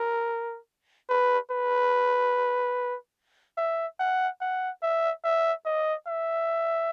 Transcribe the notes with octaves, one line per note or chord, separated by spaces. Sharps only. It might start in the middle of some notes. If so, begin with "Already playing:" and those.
Already playing: A#4
B4
B4
E5
F#5
F#5
E5
E5
D#5
E5